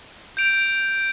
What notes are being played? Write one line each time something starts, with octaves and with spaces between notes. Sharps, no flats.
G6 D7 F7